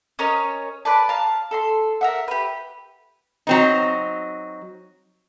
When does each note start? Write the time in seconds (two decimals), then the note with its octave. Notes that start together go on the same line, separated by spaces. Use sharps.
0.19 C#4 A#4 C#5 D#5
0.85 B4 D5 A5
1.08 F5 A5 A#5
1.51 A4 A#5 C6
2.01 A#4 E5 F#5
2.28 G4 B4
3.47 F#3 C4 D#4